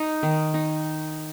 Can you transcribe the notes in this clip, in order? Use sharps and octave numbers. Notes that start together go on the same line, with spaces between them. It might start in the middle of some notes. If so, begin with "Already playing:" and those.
Already playing: D#4
D#3
D#4